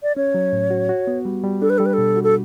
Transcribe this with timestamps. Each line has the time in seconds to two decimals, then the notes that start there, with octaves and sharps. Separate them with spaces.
0.03 D5
0.16 C#4 C#5
0.35 F#3
0.53 A2
0.71 F#4
0.89 F#4
1.07 B3
1.25 G3
1.44 G3
1.62 D4 A4
1.70 B4
1.78 G3 A4
1.86 B4
1.93 B2 A4
2.16 F#4
2.24 A4